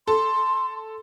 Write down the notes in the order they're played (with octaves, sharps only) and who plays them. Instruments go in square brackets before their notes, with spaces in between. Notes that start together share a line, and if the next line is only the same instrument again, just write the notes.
[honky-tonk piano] A4 [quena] C6